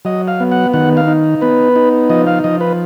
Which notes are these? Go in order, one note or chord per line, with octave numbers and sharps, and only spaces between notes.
F#3 D#5
F5
B3
F#5
D#3 F#5
F5
D#4
B3 B4
D#4
F3 D#5
F5
F3 D#5
B4